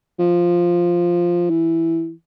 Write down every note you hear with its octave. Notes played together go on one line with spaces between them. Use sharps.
F3
E3